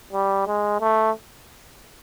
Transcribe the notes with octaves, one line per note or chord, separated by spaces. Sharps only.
G3
G#3
A3